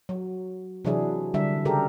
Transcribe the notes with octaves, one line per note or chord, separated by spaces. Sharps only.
F#3
C3 E3 F#3 D4 E4 G#4
D3 G3 D4 E5
C#3 G4 A4 A#4